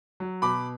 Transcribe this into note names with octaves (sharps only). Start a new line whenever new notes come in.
F#3
B2 B5 D6